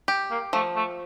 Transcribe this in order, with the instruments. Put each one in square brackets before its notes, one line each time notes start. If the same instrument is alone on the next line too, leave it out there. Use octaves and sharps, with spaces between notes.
[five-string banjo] G4
[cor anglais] A#3
[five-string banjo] F3 [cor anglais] A3
[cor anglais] A3